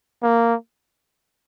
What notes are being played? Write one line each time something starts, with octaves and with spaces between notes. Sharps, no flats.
A#3